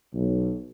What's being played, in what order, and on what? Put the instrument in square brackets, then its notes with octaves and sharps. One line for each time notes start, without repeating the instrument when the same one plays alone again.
[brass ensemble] B1